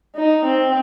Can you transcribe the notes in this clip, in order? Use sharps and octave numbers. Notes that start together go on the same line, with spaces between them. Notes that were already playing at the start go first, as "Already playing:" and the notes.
D#4
C4